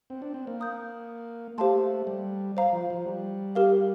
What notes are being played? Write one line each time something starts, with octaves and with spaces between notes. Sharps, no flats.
C4
D4
C4
A#3
F5 A#5 D#6 G6
A3 G4 C5 F5 A5 C6
G3
C5 F5 A#5
F3
F3
G3
G4 A#4 F5